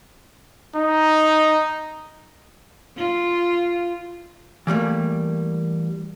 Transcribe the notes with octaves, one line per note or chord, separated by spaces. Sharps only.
D#4
F4
E3 G3 A3 A#3